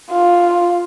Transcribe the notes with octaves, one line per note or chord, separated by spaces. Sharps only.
F4